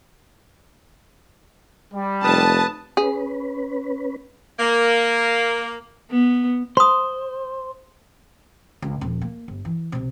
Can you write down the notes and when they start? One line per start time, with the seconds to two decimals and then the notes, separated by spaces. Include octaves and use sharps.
1.93 G3
2.24 F1 B4 A5 D#6
2.97 C#4 G#4 B4
4.60 A#3
6.11 B3
6.77 C5 C6 D#6
8.82 C#2
9.01 D#1 F2
9.21 A#3
9.48 G1
9.65 E3
9.92 B1 C3